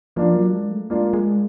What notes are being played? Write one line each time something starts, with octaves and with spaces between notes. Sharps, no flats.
F3 A#3 D4 F4
F#3
G#3
A3
G#3 A#3 D4 F4
G#3